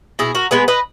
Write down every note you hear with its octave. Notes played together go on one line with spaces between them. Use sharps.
B2 E4 G#4
F#4 A#4
G#3 B3 G#4 B4
B4 D#5